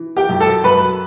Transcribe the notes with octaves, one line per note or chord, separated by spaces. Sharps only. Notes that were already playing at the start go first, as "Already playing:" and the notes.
Already playing: E3
G4 G5
F#2
A4 A5
F#2 B4 B5